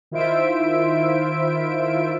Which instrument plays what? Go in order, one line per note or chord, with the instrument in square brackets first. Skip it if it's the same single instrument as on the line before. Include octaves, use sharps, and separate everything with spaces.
[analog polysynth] D#3 E4 F4 C5 E5 D7